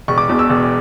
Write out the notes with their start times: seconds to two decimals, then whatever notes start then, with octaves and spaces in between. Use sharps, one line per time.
0.08 E1 C#6
0.18 D6
0.29 E2 B2
0.39 E6
0.50 E1